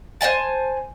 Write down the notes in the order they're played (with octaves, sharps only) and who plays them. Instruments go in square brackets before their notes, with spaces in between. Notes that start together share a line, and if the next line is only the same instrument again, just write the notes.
[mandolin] C5 D#5 G#5 A5